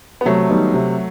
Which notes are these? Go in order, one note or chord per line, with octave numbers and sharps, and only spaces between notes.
B3
C3 F#3 A3
D#3 G3 B3 D#4
C3